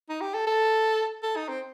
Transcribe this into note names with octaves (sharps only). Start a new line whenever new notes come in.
D#4
G4
A4
A4
A4
D#4
C4